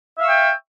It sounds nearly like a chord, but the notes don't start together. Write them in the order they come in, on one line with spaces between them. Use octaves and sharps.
E5 F5 E6 C#6 G5